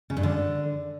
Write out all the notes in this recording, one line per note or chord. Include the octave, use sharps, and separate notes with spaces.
C#3
G2
D3